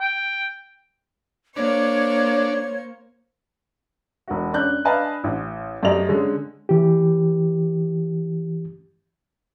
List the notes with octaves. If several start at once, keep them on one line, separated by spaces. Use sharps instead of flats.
G5
A#3 D4 C5 C#5 C#6
E1 F#4
C#4 D4 F#6 G6
D4 B4 D#5 F5 G#5 A5
A1
F#2 A3 G4 D5 D#5 F7
D3 G#3 C#4
E3 G4